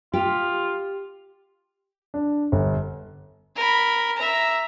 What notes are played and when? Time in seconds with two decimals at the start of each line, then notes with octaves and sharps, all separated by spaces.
0.14 F4 G4
2.14 D4
2.52 G1
3.56 A#4 B5
4.17 E5 A#5